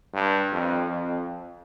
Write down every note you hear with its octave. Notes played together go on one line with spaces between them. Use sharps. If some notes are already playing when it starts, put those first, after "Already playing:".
G2
F2
F2